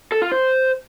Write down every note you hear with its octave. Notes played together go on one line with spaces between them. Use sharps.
A4
F4
C5